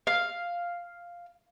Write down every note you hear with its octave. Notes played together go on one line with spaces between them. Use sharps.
F5